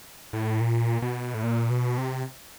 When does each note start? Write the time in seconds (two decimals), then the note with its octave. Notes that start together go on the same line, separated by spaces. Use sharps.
0.33 A2
0.61 A#2
1.02 B2
1.34 A2
1.43 A#2
1.70 B2
1.98 C3